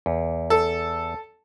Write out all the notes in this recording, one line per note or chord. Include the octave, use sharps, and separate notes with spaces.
E2
A4